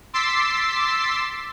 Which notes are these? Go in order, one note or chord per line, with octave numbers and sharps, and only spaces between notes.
C6 D6 E6 A6 B6 C7